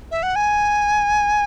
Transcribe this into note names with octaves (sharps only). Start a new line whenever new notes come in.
E5
F#5
G#5